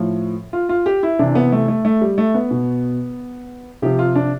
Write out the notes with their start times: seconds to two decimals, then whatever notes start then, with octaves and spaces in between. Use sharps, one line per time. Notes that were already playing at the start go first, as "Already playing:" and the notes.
Already playing: A2 F3
0.53 F4
0.69 F4
0.86 G4
1.03 E4
1.19 C3 E3 D4
1.35 B3
1.52 A3
1.68 A3
1.85 A3
2.01 G3
2.18 A3
2.34 B3
2.51 B2
3.82 C3 F3 G4
3.99 F4
4.16 D4